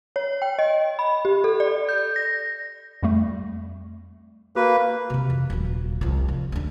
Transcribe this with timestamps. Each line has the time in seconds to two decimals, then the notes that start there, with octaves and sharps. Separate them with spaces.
0.16 C#5
0.42 G5
0.59 D#5
0.99 B5
1.25 G4
1.44 A4
1.60 D5
1.89 G6
2.16 A#6
3.03 F2 G3 A3
4.56 A#3 F#4 B4
5.10 C3 D#3
5.30 F2
5.50 D#1 F#3
6.01 C2 F3
6.28 D#3
6.52 D2 D4